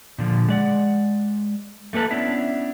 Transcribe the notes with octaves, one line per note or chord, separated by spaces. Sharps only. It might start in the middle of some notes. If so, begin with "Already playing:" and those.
A#2 D3 F3
G#3 D5 F#5
A3 A#3 A4 B4 A5
B3 C#4 D4 E4 E5